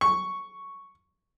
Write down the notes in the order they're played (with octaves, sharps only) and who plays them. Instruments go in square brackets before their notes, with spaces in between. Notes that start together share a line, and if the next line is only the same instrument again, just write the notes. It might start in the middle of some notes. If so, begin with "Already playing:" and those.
[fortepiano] C#6